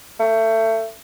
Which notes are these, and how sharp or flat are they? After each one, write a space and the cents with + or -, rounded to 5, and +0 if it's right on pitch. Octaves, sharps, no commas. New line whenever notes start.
A3 +25